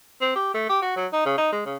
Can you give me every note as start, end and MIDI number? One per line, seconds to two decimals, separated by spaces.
0.21 0.32 60
0.36 0.52 67
0.54 0.66 57
0.69 0.80 67
0.82 0.93 66
0.96 1.06 54
1.13 1.24 63
1.26 1.33 49
1.38 1.51 63
1.52 1.62 56
1.66 1.77 49